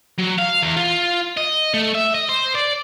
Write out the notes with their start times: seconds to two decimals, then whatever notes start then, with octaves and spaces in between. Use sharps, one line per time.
0.19 F#3
0.39 F5
0.63 E2
0.76 F4
1.37 D#5
1.74 A3
1.95 E5
2.14 D#5
2.29 C5
2.54 D5